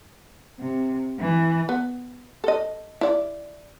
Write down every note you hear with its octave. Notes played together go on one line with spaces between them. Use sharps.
C3
E3
B3
A4 D#5
E4 D5